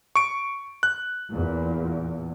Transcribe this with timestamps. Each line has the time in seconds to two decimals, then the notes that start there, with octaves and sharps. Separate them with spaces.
0.15 C#6 D7
0.83 F#6
1.29 E2 A#2